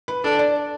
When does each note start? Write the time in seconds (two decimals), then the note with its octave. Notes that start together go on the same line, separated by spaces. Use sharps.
0.08 B4
0.24 D4 A4
0.39 D5